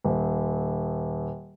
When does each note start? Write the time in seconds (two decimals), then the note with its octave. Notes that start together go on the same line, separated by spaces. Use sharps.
0.04 D#1